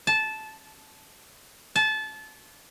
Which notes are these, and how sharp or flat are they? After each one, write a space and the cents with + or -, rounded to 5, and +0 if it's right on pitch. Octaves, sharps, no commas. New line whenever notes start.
A5 -15
A5 -25